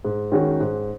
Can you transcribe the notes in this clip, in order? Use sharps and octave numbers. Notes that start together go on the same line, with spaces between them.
G#2
D#3 G#3 C#4 F#4
G#2